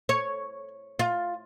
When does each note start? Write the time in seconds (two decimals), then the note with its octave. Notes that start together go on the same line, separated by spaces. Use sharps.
0.09 C#5
0.99 F4